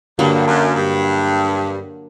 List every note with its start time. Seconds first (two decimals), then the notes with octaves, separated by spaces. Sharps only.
0.19 G2 D3 F#3 A#3
0.47 F#2
0.76 G2